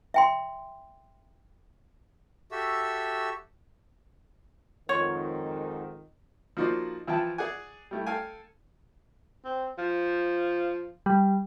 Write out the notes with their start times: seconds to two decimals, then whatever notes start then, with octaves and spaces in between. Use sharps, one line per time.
0.14 E5 G5 C6
2.51 F#4 G4 A4 E5 E6
4.89 F2 G#2 D#3 F4 C#5
6.57 F3 A#3 D#4 F#4 C5 D5
7.07 E3 F3 E4 G5 A5
7.38 G#4 D5 F#5 G#5
7.91 G3 A3 E4
8.07 A4 F5 G5 G#5
9.45 C4
9.78 F3
11.06 G3